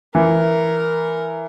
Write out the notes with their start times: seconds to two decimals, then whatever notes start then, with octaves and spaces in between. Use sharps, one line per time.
0.15 E3 A#4